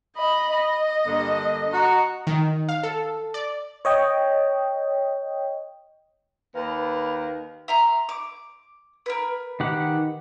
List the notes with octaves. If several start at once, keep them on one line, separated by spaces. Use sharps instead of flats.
D#5 B5
D#5
G2 D3 A#3
F#4 A#5
D#3
F5
A4
D5
C#5 D#5 G5
D#2 A#4 B4 F5
E5 A#5 C6
D6
A#4 B4
D#3 G4 F#5